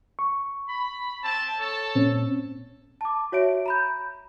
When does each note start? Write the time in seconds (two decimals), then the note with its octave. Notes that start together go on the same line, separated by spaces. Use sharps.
0.19 C#6
0.68 B5
1.23 C4 A5
1.59 A4 C#5 A5
1.95 A#2 C4 C#4
3.01 A5 D6
3.32 F#4 C#5 E5 D7
3.66 A#5 B5 G6